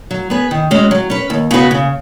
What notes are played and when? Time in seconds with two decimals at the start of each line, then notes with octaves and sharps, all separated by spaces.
0.11 F#3
0.30 B3 G#4 B4
0.51 D#3
0.71 G#3 C#4 F#4
0.91 F#3
1.10 C#4 B4
1.30 D#2
1.51 C#3 B3 F#4 B4
1.71 C#3